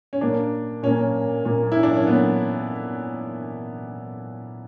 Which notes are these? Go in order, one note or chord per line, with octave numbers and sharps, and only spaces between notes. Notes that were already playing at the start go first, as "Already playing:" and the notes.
C#4
A#2 A#3 D4
A#2 A#3 C#4
A#2 A#3
E4
D4
C#4
A#2 A#3 B3